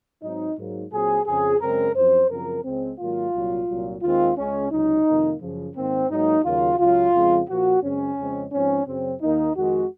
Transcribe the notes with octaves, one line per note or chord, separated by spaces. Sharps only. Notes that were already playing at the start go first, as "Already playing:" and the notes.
G#2 F#3 C4 D#4
G#2 F#3 A#3
A#2 F#3 C4 G#4
F2 C#3 F3 G#4
F#2 C#3 G#3 C4 A#4
F#2 F3 C4 C5
F#2 C#3 F3 C4 A#4
C#2 C#3 G#3 C4
G#2 D#3 F#3 A#3 F4
C2 A#2 F#3
C2 A#2 F#3
D#2 D#3 G#3 C4 F4
C#2 C#3 G#3 C#4
C#2 C3 F#3 D#4
F2 C3 D#3 A#3
F#2 C#3 F3
G#2 D#3 A#3 C4
G#2 F#3 A#3 D#4
D#2 C#3 F#3 A#3 F4
C#2 C#3 F#3 F4
F2 C#3 F3 G#3 C4
A#2 F3 A#3 F#4
F#2 C#3 G#3 C4 C#4
F2 C#3 G#3 C4
G#2 F3 C4 C#4
F#2 C#3 F#3 C4
D#2 D#3 A#3 D#4
F2 D#3 G#3 F#4